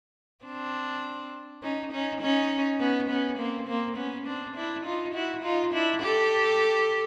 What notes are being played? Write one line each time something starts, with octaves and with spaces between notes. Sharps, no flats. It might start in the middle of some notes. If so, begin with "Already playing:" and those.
C4 D4
C#4 D#4
C#4 D#4
C#4 D#4
B3 C#4
B3 C#4
A#3 C4
A#3 C4
B3 C#4
C4 D4
D4 E4
D#4 F4
E4 F#4
D#4 F4
D4 E4
G4 A4